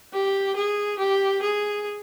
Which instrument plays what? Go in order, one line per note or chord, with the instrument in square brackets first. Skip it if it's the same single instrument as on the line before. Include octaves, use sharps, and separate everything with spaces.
[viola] G4
G#4
G4
G#4